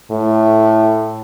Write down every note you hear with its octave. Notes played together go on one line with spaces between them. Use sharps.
A2